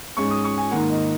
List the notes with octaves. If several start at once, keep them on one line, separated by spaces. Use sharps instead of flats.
G#2 G#3 C#4 C#6
D#6
C#6
G#5
G#2 D#3 A#3 F#5
D#5